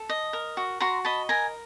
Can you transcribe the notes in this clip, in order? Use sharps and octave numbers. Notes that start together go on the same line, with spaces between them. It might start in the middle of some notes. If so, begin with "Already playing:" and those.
Already playing: A4
D#5
A#4
F#4
F#4 A#5 C6
D#5 A5 B5
A#4 G#5 A#5